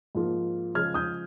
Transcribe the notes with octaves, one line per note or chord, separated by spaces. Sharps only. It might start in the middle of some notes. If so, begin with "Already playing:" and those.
G#2 F3 A#3 F4
C#3 F3 G#3 F6 G#6
D#6 G6